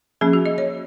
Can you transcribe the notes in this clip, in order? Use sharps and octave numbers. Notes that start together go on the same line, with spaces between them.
F3 A#3 C#4 G#4
F#4
D#5
C#5